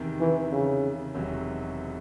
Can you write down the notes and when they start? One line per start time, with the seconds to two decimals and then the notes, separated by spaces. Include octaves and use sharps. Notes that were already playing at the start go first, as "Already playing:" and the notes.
Already playing: E2 C3 D#3
0.20 E3
0.52 C#3
1.14 E1 E2 C3 D#3 F#3